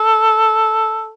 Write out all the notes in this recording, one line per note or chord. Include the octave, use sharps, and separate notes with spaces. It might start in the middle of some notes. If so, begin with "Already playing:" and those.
Already playing: A4